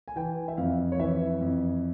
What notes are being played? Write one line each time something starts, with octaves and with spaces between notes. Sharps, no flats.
G#5
E3 G5
E5
F2 F5
C#5
E3 E5
F2